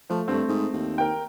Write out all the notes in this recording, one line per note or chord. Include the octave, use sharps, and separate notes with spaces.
F3 A3
G2 A3 C4
G#2
D#2
A#4 G5